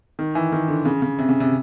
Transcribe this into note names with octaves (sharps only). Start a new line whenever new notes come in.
D#3
E3
D#3
D3
C#3
C#3
C3
C#3
C3